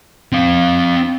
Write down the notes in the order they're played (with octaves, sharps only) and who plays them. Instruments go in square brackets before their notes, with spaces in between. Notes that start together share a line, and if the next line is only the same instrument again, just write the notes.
[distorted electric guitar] C4 F5